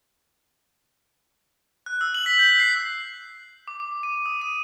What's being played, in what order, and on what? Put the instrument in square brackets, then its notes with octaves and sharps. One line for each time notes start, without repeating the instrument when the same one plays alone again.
[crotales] F#6
E6
F#7
B6
G6
C7
D6
D6
D#7
D#6
D#7